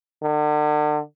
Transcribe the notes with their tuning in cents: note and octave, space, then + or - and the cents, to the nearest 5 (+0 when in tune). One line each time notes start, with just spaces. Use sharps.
D3 +35